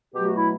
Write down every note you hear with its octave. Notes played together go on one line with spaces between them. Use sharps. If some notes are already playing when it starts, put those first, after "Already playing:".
B2 F#3 A3 G4
F#4
E4